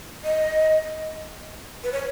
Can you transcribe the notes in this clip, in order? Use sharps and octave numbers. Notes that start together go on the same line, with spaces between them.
D#5
B4
C#5